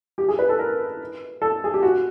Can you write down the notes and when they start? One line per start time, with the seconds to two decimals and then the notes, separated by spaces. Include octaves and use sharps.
0.18 G4
0.29 G#4
0.39 B4
0.49 A4
0.59 A#4
1.42 A4
1.64 G#4
1.74 G4
1.83 F#4